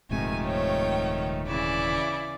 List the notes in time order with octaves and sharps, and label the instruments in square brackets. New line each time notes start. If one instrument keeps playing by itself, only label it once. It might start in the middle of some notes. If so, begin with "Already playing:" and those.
[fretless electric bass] D#1 G#2 C3 [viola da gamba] D#3 F3 A3 [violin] G#5
[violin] C#5 G5
[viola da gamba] C#3 E3 D5 [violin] E4